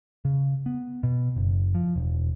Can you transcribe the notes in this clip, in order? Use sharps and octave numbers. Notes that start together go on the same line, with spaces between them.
C#3
B3
B2
F#1
F3
E1